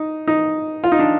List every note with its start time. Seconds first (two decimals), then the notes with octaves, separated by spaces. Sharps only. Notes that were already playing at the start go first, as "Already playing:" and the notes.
Already playing: D#4
0.28 D#4
0.84 F4
0.92 D#4
0.99 D4